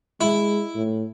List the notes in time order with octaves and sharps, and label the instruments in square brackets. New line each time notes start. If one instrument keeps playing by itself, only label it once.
[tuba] G#3 [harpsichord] E4
[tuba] A2